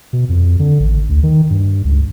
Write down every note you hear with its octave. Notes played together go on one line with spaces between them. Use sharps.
B2
F2
D3
A1
D2
D#3
G2
C#2